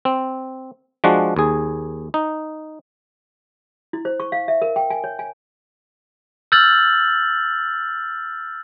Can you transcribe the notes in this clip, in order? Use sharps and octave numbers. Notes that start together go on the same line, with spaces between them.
C4
F3 G#3 D4 F#4
D#2 G#4
D#4
E4
C5
C#6
F5
E5
A#4
G5
G#5
C#5
G#5
E6 F6 G6 A6 F#7